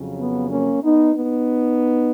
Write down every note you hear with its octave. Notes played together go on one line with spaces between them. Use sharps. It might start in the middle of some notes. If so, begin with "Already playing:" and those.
Already playing: F2 C#3 F#3
B3
A#3 C#4
B3 D#4
B3 D#4